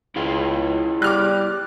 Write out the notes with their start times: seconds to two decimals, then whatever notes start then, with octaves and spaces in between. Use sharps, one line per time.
0.16 C#2 E4 G#4 F5
1.02 G3 D6 F6 F#6